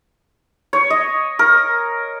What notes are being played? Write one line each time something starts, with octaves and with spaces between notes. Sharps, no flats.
C#5
D#5
A#4